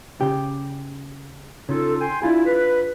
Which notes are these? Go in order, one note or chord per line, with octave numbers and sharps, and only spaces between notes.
C#3 G4
C#3 D#4 F4 A4
G5 G#5 C6
D4 E4 F4 G#4
B4